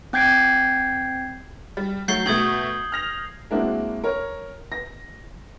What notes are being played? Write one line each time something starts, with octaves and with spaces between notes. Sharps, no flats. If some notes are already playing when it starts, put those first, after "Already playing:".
C4 G5 G6 G#6 C7 D7
G3
F#3 A3 G6 C7 G7
B2 A3 D#6 G#6 F#7
F6 A#6 F7
G#3 A#3 C4 D4 E4 F#4
A#4 C#5
A#6